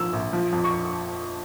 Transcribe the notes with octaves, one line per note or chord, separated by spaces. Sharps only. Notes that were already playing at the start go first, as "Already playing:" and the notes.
Already playing: A#1 G#2 F3 E6
A#1
F3
F2
C#6